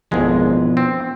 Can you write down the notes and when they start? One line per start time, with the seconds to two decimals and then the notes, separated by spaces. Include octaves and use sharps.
0.12 G#1 F2 B2 E3 F3 G#3
0.77 C4